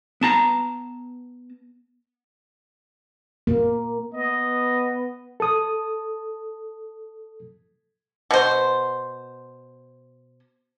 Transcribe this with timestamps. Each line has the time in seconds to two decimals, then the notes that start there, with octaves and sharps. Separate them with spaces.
0.21 B3 A5 A#5
3.47 A#3
4.14 B3 D#5
5.40 A4 D#6
8.31 B2 C5